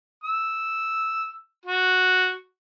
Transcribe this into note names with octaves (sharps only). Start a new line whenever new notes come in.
E6
F#4